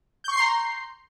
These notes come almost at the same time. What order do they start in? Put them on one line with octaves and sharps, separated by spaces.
G6 C#6 C7 C6 A#5